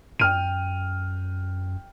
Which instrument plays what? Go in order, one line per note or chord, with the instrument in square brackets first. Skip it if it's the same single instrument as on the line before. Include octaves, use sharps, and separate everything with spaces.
[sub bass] F#2 [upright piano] G5 F6 D#7